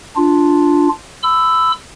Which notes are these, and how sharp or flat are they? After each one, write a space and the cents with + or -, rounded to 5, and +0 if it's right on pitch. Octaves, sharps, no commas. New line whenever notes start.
D4 +0 F4 +0
B5 +30 E6 +0